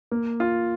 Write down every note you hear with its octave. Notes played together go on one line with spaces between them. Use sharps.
A#3
F4